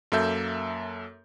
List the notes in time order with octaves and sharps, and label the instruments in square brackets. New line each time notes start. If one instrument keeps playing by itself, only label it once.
[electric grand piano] F#2 A#3 A4 E5 G6